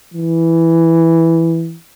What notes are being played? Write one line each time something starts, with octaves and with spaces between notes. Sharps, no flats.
E3